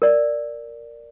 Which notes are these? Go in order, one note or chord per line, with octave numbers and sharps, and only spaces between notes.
A#4 D5